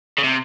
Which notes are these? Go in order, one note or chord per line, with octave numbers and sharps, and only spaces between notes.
C#3
C3